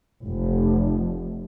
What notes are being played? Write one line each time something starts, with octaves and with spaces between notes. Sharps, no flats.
F1